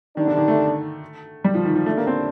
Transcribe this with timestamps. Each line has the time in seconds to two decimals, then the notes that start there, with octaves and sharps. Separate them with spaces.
0.16 C3 D#3 G3 D4
0.27 D3
0.37 D#3
0.48 A3
1.44 G3
1.55 F3
1.65 D#3
1.76 F3
1.86 A2 G3 A3 D4
1.97 A#3
2.07 C4